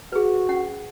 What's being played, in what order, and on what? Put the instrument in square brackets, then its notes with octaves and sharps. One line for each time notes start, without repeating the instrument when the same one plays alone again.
[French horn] F#4 [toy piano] G#4 B4
[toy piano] C#4 F#5